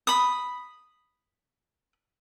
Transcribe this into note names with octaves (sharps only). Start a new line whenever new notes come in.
B5 D#6